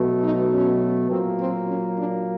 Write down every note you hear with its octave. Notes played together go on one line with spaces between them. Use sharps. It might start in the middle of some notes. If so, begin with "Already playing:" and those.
Already playing: B2 F#3 A3
D#4
C#4
A#2 F#3 A#3 C4
C4
C#4
D4